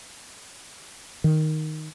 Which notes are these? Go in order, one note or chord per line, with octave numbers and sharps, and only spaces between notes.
D#3